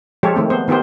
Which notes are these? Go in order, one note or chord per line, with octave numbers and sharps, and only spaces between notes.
F3 G#3 F4 G4 A4 C#5
D#3 A3 C4
B3 C5
D#3 B3 F4 G4 C5